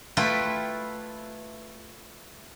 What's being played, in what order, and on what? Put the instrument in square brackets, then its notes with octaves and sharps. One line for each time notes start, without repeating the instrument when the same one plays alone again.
[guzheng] A3 E4 F4 A4 B4 G5